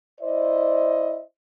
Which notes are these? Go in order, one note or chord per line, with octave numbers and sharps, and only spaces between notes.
E4 C5 D5 D#5